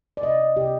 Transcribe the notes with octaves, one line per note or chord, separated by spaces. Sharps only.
D5
C3 D#5
C3 G4